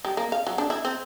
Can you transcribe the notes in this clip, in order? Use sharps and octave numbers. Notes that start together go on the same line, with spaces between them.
G3
A#3
F5
F#3
D4
E4
C4